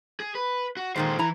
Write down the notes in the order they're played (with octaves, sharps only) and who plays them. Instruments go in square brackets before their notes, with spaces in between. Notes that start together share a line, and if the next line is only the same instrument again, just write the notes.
[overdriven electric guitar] G#4
B4
F#4
[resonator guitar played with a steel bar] A#2 D#3 G#3 [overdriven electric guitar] A4 C5
[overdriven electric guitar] E3 [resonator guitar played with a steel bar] E4 A#5